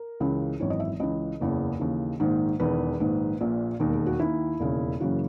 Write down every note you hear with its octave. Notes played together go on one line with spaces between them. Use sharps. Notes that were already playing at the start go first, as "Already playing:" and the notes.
Already playing: A#4
C#2 C#3 E3
G#1 F#2 E3 C#5
D#5
E5
C#2 C#3 E3 D#5
F#1 E2 C#3 E3
D#2 C#3 E3
A#1 G#2 D#3
E1 E2 D#3 B4
A#1 G#2 D#3
A#1 A#2
E1 D#2 D#3
G#4
F#4
D#2 D#3 E4
E1 D#2 C#3
F#1 F#2 C#3 E3 F#4